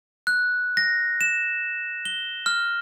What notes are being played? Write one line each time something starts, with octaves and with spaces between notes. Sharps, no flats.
F#6
A#6
E7
G7
F6